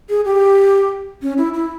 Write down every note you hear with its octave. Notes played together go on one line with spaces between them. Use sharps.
G#4
G4
C#4
E4
E4